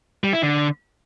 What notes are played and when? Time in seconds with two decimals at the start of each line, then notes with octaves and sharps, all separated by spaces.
0.24 G3
0.33 E4
0.42 D3